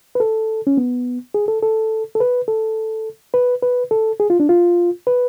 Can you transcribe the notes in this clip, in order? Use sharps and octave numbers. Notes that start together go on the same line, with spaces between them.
B4
A4
C#4
B3
G#4
A4
A4
A4
B4
A4
B4
B4
A4
G#4
F4
D4
F4
B4